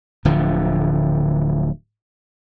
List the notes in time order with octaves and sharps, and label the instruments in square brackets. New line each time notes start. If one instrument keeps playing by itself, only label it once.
[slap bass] D1 D3 F3